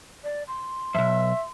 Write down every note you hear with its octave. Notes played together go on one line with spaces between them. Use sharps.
D5
C6
B1 F2 E5